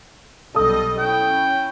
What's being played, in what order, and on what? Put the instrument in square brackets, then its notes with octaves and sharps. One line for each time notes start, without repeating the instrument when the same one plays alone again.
[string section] B1 G3 D#5 [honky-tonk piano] A4 D#6
[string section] C#4 E4 [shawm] G5